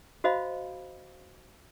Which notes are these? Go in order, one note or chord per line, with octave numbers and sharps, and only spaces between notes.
F#4 C5 D#5 F5 B5